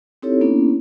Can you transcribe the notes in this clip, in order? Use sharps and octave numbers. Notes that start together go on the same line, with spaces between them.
C4 D#4 E4 G4 A4 C#5
A#3 B3 C#4 D4 E4